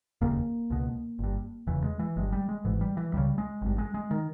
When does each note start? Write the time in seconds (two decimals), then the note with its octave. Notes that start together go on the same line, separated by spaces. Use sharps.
0.21 E1 D#2 C#3 A#3
0.70 C#2 B2
1.19 G1 G2
1.67 E1 E2 C#3 E3
1.84 G#3
1.99 E3
2.16 G1 G2 G#3
2.32 G3
2.49 G#3
2.65 G#1 G#2 E3
2.81 G3
2.97 E3
3.13 C#2 C#3 G3
3.38 G#3
3.62 G#1 G2
3.78 G#3
3.94 G#3
4.11 D#3